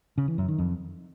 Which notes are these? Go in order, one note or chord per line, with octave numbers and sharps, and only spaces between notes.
C#3
E3
F#2
D#3
F2